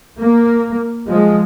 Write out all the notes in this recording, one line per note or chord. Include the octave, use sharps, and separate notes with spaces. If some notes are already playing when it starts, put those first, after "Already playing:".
A#3
F3 G#3